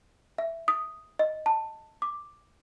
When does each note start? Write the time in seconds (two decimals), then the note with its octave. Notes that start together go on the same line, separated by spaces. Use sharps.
0.38 E5
0.68 D#6
1.19 D#5
1.46 A5
2.02 D6